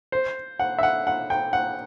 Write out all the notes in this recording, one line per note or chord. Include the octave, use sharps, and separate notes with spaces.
C5
F#5
E5
F#5
F#5
G5
F#5